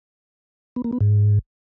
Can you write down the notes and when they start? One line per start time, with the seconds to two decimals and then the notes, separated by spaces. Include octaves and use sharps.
0.76 B3
0.84 A#3
0.92 B3
1.01 G#2